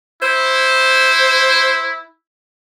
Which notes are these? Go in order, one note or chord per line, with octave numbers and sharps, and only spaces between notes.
E4 C5